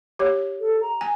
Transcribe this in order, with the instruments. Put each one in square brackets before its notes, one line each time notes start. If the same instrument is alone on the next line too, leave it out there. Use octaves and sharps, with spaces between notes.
[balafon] G4 C#5
[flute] A4
A#5
[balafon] G#5